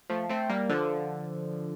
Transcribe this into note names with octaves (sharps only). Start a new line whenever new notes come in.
F3 A3
A3 C4
G3 A#3
D3 F3